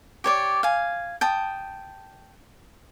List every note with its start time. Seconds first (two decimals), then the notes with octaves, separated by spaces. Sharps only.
0.24 G4 C#5 D5
0.63 F5 G#5
1.21 G5 A5 D#6